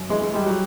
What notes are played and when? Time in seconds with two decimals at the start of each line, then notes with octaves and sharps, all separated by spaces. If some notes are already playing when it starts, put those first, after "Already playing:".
Already playing: F#2
0.09 E3 G#3
0.22 G#3
0.34 G3 G#3
0.46 F#3